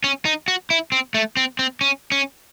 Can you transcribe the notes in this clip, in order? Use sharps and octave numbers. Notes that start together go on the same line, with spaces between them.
C#4
D#4
F#4
E4
C4
A3
C4
C4
C#4
C#4